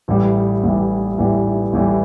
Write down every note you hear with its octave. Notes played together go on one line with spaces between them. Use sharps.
A1 A2 E3 G3
A1 A2 E3 G3
A1 A2 E3 G3
A1 A2 E3 G3